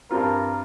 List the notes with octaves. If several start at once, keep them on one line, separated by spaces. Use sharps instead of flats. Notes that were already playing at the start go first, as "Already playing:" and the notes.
G2 G3 C4 F4 A#4